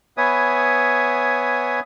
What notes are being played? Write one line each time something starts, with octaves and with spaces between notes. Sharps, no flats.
B3 B4 C#5 E5 G#5 D#6